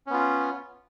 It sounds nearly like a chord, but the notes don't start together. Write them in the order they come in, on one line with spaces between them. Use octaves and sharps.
C#4 B3 F4